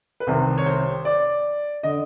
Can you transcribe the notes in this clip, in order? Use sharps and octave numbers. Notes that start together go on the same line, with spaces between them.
B4
C2 C3 D#3 C5
C#5
C5
D5
D3 D#5